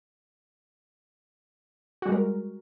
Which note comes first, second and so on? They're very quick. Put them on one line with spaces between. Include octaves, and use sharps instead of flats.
F#4 G3 G#3 A#4